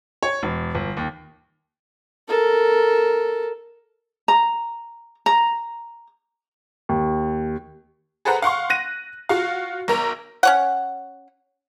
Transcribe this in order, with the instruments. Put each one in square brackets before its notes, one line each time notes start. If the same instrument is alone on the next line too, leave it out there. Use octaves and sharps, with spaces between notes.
[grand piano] C#5
E1
G1
D#2
[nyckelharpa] A4 A#4
[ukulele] A#5
A#5
[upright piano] D#2
[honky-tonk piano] G#4 A4 B4 C5 F#5 A#5
F5 F#5 C6 C#6
F#6 A#6 D#7
F4 F#4 F5
B1 A#4 F7
[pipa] C#4 C#5 F#5